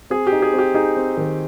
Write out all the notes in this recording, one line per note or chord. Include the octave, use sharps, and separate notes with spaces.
C4 G#4
G4
D#4
G#4
C4
G4
D#4 G#4
C4
D#3